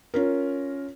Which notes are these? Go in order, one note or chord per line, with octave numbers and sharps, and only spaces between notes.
C#4 F4 A#4